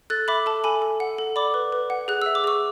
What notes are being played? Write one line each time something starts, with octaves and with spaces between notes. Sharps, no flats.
A4 F#6 A6
E5 B5 D6
A4 A5
A4 G#5 B5
A4
F#5
A4
D5 B5 D6
B4
B4
F#5
G#4 F#6
E5 E6
D6
G#4 C#6 E6